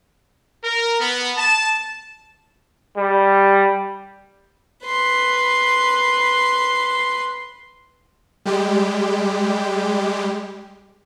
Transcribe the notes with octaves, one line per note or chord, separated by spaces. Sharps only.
A#4
B3
A5
G3
B4 C6
G3 G#3 G4